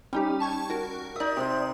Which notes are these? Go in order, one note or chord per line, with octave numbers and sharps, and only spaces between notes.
G3 C#4 D#4 G4
A5 C#6 G#6
F#4 A#4
D#4 D5 E5 D#6
C3 C5